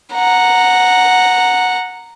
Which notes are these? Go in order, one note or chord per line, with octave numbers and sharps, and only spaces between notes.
F#5 A#5